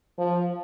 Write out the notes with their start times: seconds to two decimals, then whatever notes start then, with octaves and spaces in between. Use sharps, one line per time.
0.18 F3